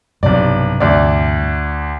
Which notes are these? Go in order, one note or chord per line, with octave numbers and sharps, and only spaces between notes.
B1 G2 C3 D5
D2 D5